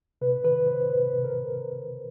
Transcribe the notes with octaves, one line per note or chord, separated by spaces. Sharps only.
C3 B4
D#3 B4
C3 C5
C3 B4
C3
A#4